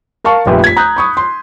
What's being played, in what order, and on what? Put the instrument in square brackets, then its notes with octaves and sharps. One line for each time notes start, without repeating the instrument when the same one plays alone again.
[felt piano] A#4 F5 A5 C#6
F1 A#1 F4 G4 B4 E5
G#6 B6
A#5 D#6 F#6 G6
B5 C#6 D#6
C6